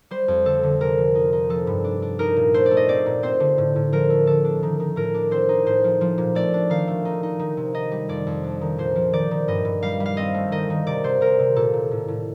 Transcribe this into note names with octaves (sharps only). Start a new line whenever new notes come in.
G3 C5
F2
D3 A4
D3
C3 A#4
F3
D#4
D#4
F3 A4
G2
D4
D4
D#4 A#4
A#2
A3 C5
D5
A3
D#5
C4 D5
A#2
C4 C5
D3
A2
A2
F3 A#4
A3
D3 A4
D4
D#3
D#3
A2 A#4
D4
C4 C5
D#4
A2 C5
F3
F3
A#2
A3 D5
D4
D#3 F5
A3
D#4
D#4
D#3
C3
D#4 D#5
G3
F2 D5
F2
D4
D#3
A#2 C5
F3
D#3 D5
D#3
G2 D#5
G2
G3 F5
G3
F5
C4 D#5
A3
D#3 D#5
D#3
C3 D5
C3 C5
C3 A#4
C3
A#2 A4
A#2
A2
A2